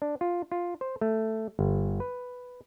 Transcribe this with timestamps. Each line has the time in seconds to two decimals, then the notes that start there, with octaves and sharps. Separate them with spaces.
0.02 D4
0.21 F4
0.52 F4
0.81 C5
1.01 A3
1.59 G1
2.00 B4